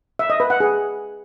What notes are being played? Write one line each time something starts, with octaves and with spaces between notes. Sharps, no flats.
E5
D#5
B4
F#5
G#4